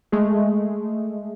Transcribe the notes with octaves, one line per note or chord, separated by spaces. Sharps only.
G#3 A3 G#4